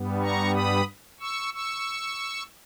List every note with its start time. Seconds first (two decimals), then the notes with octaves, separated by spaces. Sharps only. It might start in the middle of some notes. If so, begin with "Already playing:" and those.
Already playing: G2 G3 B3
0.22 A#5 C#6
0.54 B5 D#6
1.20 C#6 E6
1.54 C#6 E6